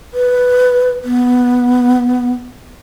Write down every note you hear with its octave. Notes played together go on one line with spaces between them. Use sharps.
B4
B3